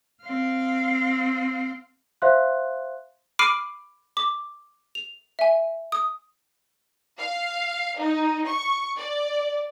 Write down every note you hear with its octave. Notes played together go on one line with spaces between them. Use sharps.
C4 F5
C5 E5 F5 C6 F#6
B5 D6 F6 C7 D7 D#7
D6
F7
E5 G#5
D#6
F5
D#4
C#6
D5